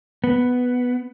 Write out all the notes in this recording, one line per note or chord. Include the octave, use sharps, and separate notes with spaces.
B3